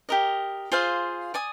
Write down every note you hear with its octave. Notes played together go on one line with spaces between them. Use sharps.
G4 A#4 D#5
F4 G#4 C5 F5
D5 G#5 D#6